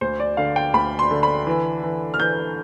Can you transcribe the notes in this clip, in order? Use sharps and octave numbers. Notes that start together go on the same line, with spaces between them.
D2 C5
D5
D3 F5
G5
D2 B5
C6
D3
B5
E3
E3
F6
E3 G6